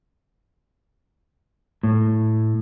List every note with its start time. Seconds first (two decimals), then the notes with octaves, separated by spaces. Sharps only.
1.83 A2